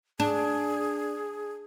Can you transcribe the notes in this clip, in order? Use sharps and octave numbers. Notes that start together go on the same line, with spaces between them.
D4 G#4